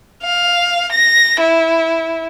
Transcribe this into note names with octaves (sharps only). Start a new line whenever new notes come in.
F5
A#6
E4